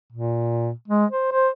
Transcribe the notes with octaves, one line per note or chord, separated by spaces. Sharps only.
A#2
G#3
C5
C5